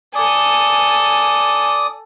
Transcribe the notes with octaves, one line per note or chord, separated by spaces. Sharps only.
A4 D5 G#5 D#6